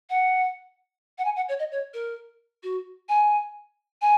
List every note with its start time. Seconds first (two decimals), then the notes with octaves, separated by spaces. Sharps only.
0.10 F#5
1.18 F#5
1.25 G#5
1.36 F#5
1.49 C#5
1.59 D#5
1.72 C#5
1.94 A#4
2.63 F#4
3.09 G#5
4.02 G#5